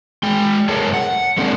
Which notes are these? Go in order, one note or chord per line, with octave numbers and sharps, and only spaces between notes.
G#3 G5
F#2 A3 G#4 A#4 C#5 A5
F#5
G#3 A#3 C4 D4